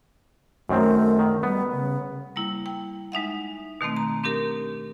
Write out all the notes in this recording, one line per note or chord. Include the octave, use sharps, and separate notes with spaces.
F#2 D#3 A3 C4
D#3
G3 B3
C#3
G3 A#3 E4
G5
G#3 D#4 E5 F#5
B2 D#3 A3 C4
A#5
C4 D4 G4 A#4